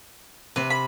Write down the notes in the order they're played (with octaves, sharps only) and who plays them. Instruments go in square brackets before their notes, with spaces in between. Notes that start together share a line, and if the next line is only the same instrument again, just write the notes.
[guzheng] C3 C4 [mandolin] B4
[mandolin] B5